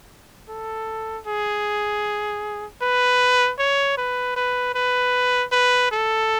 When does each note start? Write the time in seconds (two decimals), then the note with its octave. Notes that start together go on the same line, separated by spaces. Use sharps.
0.49 A4
1.27 G#4
2.82 B4
3.58 C#5
3.97 B4
4.36 B4
4.75 B4
5.52 B4
5.91 A4